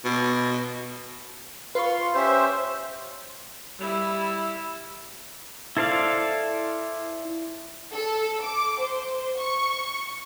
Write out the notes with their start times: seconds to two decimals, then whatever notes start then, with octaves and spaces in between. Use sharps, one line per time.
0.05 B2
1.75 F4 B4 F5 C6 C#6
2.15 C#4 G4 C5 E5
3.79 G3 E4
5.77 E4 A4 C5 D5 F5
7.93 A4
8.43 D6
8.81 C5
9.38 C#6